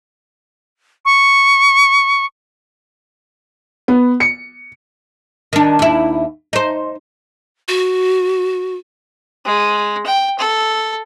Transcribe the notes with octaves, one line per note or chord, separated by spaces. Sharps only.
C#6
B3
C#7
D#3 D4
D#2 E4
D#4 C5
F#4
G#3
G5
A4